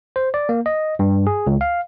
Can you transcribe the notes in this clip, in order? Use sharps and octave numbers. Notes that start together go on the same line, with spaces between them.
C5
D5
A#3
D#5
G2
G#4
C#2
F5